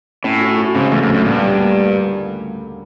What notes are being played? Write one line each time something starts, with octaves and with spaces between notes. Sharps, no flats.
A2 C#4
F#4
F#4
G#2 C#3
E2 A3
F2
D2
F#2
G2 A#2
G3
A#3